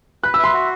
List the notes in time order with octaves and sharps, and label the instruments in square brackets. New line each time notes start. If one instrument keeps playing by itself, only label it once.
[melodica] B4 [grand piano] F#6
[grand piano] E6
[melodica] E5 [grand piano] C6
[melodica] F#4